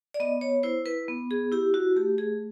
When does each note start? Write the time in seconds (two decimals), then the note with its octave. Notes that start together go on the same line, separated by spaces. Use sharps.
0.14 D5
0.20 B3 D#5
0.41 C#5
0.63 E4 C5
0.86 B4
1.08 B3
1.31 G#4
1.52 E4 G4
1.74 F#4
1.96 A3 G4
2.18 G#4